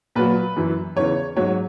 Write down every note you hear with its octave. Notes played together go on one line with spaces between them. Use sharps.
A#2 F#3 B4
F#2 E3
E2 C#3 E3 C#5
G#2 F#3 C#5